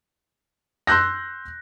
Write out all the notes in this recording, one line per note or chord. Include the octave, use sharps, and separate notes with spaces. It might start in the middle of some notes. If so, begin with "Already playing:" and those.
C6 E6 F#6 G6 A#6